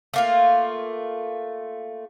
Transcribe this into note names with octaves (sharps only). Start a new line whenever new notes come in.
A3 A#3 F4